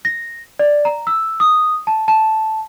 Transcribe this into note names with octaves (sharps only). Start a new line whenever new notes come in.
A#6
D5
A#5
E6
D#6
A5
A5